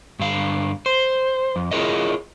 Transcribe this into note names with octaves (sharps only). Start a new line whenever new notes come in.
G2 D3 F5
C5
F2
E4 F4 G#4 A#4 C#5 D#5